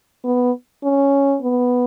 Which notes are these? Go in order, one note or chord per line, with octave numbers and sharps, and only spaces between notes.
B3
C#4
B3